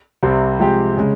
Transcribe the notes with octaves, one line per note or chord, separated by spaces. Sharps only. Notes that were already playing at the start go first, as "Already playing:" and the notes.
C2 C3 G3 C4
C3 F3 G#3 C4 G4
C#3 G#3